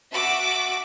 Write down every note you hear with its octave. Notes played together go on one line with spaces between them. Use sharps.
F#4 E5 A5 D6